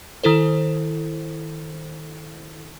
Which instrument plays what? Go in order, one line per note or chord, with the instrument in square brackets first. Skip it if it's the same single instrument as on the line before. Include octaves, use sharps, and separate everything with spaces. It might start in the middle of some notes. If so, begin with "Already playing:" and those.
[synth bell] D#3 E4 A4 C5